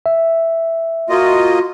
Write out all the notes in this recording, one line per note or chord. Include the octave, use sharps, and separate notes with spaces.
E5
A#3 F4 F#4 D#5